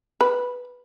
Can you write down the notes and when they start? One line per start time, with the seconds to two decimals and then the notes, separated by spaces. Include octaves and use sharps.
0.21 B4